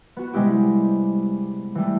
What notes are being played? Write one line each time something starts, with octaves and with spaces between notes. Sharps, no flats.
B3 F#4
C3 G3 G#3 B3 E4 G4
E3 G3 A3